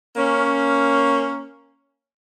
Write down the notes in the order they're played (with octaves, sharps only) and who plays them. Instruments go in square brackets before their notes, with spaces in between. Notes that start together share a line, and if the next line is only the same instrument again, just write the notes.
[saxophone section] A#3 C#4